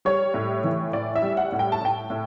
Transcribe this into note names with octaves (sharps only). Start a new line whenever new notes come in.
G3 C#5
A2
E3
A2 D5
E5
G3
F#5
A2
G5
A5
A2 G5
A2